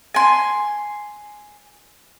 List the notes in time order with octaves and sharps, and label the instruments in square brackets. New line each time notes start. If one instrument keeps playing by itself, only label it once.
[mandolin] G#5 C6